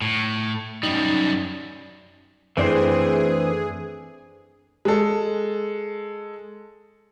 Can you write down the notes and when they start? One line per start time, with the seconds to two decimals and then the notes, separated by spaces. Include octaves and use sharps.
0.02 A2
0.83 F#2 G3 D#4
2.57 F#2 E3 A3 C4 D4 G#4 C5 D5
4.85 G#3 A4